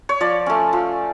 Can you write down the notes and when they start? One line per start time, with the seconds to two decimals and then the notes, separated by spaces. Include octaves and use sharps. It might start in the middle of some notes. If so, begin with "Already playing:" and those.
0.09 C#5
0.21 F3 D5
0.46 A3 C#4
0.73 F3